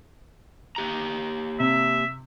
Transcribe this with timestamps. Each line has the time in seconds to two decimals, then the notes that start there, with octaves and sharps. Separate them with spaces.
0.76 A#3 G4 A#5
1.60 C3 E5